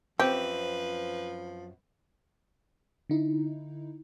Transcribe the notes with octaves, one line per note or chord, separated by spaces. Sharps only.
F#2 F3 C4 G4 B4
D3 D#4 E4